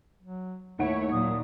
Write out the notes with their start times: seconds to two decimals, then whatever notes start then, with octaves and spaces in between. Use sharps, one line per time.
0.22 F#3
0.79 D#2 A3 E4 C#5 F#5 D7
1.12 A#2 F#3 D#6